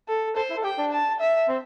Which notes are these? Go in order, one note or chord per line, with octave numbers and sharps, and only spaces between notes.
A4
A4 C5
E4
A4
G4 G5
D4
A5
E5
C4